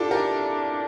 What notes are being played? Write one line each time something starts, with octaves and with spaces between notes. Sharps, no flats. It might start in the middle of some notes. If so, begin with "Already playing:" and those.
Already playing: D4 E4 F4 G4 A4
G4 A#4